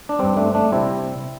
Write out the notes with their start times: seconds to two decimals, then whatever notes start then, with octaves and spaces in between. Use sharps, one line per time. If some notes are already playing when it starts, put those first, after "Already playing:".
0.09 D4
0.19 G2 G3 C4
0.37 A3 D4
0.55 A3 D4
0.72 C3 G3 C4 E4